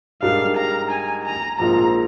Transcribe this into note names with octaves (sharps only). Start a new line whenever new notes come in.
G#2 G3 D4 G4 A#4 F5
A#5
G#5
A#5
A#1 G#2 F3 A#3 F4 A#5